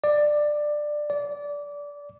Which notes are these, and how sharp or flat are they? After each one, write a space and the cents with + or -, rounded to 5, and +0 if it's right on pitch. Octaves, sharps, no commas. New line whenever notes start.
D5 +15
D5 -20